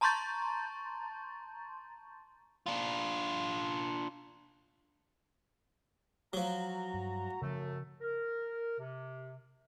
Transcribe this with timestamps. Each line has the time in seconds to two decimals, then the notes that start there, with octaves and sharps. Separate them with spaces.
0.01 A5 A#5 C6 C#6 G6 A6
2.66 D4 F4
6.33 F3 F#3 F#4 A#5
6.94 G2
7.42 F#2 C#3 F3 A3
8.01 A#4
8.79 C3